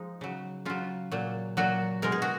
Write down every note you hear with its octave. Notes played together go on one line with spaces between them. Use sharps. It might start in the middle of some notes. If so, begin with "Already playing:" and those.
Already playing: F3 G#3 D#4
C#3 F#3
C#3 F#3 F4
A#2 F#3
A#2 F#3 F#4
B2 G#3 A#4
G#4
F#4